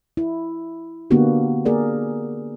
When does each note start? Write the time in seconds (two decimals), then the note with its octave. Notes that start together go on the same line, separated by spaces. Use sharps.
0.17 E4
1.11 D3 A#3 B3 D4 F#4 G4
1.65 A#3 G#4 A#4 D5